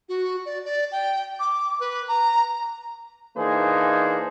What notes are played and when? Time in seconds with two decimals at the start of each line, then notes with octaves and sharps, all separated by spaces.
0.08 F#4
0.45 D5
0.64 D5
0.91 G5
1.39 D6
1.80 B4
2.08 A#5
3.37 E3 A#3 D4 D#4 G#4 C5